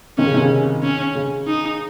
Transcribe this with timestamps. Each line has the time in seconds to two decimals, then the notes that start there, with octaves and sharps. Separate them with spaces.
0.18 C3 D#3 C#4
0.26 C#3
0.34 C3 D#3
0.42 C#3
0.83 C#4
1.15 C#3
1.47 D#4